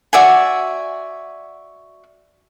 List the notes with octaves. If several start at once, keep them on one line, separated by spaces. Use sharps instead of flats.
F#4 D5 E5 G#5